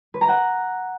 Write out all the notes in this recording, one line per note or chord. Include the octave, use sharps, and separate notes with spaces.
B4
A#5
F#5